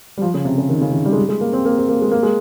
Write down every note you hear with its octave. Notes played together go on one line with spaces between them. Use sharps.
G3
F3
C#3
C3
C#3
D#3
C#3
D#3
G3
G#3
G3
G#3
A#3
C4
A#3
C4
A#3
G#3
A#3
G#3